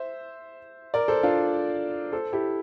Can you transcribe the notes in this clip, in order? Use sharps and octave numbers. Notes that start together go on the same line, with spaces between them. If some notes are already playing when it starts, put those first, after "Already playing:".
Already playing: C5 E5
A#4 D5
A4 C5
D4 F4
A4 C5
E4 G4